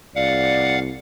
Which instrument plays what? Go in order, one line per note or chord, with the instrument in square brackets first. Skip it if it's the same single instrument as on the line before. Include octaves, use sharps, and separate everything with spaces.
[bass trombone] C2 [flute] D5 [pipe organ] F5 F#5